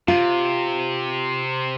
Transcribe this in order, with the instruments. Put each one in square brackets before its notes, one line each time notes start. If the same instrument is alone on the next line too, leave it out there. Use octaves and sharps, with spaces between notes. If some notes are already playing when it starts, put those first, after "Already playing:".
[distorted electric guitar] C3 [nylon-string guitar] F4